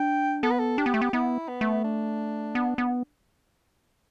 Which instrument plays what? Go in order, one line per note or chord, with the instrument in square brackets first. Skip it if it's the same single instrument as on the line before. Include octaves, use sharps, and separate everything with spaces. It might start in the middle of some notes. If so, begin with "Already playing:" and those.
Already playing: [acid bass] D4 [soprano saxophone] G5
[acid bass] B3 [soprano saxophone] A4
[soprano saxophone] B4
A4
[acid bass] D4 [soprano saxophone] G4
[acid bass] B3
A3
B3
[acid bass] B3 [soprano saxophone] E4
[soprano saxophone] B3
[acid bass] A3
[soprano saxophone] D4
[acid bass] B3
B3